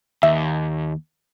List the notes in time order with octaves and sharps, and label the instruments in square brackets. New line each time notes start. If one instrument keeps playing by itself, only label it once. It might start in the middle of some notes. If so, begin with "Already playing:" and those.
[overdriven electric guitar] D#2 [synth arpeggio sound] E5